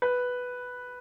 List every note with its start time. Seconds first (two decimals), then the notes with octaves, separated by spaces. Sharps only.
0.02 B4